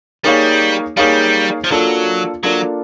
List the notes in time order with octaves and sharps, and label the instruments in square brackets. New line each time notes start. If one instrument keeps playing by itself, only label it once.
[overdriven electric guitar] G3 [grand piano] A#3 D#4 G#4 C#5 F5
[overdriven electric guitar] G3 [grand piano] A#3 D#4 G#4 C#5 F5
[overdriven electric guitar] F3
[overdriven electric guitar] F#3 [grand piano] A#3 D4 F4 A4
[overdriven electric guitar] F#3 [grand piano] A#3 D4 F4 A4